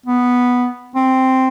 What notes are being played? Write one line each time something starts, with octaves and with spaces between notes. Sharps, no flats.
B3
C4